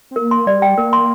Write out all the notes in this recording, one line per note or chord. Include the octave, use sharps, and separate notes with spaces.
C4
A#3 A#4
C6
G3 D5
G5
A#3 A#4
C6